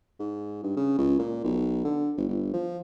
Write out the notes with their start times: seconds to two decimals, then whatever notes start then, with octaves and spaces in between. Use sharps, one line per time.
0.19 G#2
0.63 G2
0.77 C#3
0.98 C#2
1.19 A#2
1.44 B1
1.85 D3
2.17 G1
2.29 G1
2.53 F3